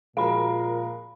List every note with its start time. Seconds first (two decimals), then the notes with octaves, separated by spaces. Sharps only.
0.17 A#2 F3 G#3 F#4 A#4 F5 B5